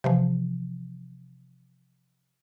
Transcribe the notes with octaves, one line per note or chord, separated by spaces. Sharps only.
C3 E3 F3